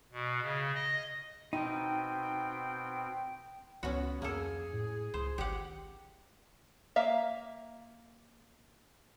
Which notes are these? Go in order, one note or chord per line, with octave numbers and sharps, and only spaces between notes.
B2
C#3
D#5
B2 C4 D#4 G5
C#2 B3 C#4 F#4
F2 A#3 G#4 A4
A2
C#2 C5
G#1 G4 F#5
A#3 E5 F5